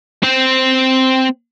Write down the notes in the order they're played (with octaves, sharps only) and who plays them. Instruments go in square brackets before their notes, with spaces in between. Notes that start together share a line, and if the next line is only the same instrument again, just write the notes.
[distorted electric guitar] C4 C5